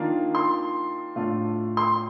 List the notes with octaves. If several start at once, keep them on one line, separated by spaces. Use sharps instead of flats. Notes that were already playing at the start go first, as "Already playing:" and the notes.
Already playing: D#3 A#3 D4 F4
C6
A2 A3 D4 F4
C6